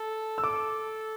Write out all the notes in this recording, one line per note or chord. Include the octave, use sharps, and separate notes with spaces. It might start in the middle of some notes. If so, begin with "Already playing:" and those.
Already playing: A4
E6
A4 D6